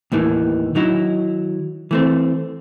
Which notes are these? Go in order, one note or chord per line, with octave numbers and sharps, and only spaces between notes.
D#2 A2 D#3 E3
D#3 F#3 D#4 E4
E3 A3 C4